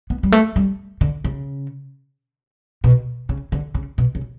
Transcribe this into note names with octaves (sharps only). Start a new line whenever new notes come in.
B3
G3
A3
G3
D3
C#3
B2
C#3
D3
C#3
B2
C#3